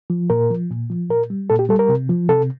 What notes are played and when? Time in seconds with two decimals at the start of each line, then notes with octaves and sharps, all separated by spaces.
0.10 F3
0.30 A#2 A#4
0.51 F3
0.71 A#2
0.90 F3
1.10 A#2 A#4
1.30 G3
1.50 A#2 A4
1.59 G4
1.69 G3 A4
1.79 A#4
1.89 C3
2.09 F3
2.29 C3 A4